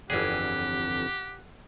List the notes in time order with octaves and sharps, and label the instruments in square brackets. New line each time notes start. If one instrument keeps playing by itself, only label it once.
[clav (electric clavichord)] G1 G#4 [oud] F2 D3 E3 [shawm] G4 [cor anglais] F#5